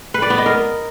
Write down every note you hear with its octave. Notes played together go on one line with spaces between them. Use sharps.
B4
D5
B3
D#5
A#4